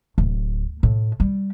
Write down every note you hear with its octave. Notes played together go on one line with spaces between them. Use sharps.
D1
A2
G3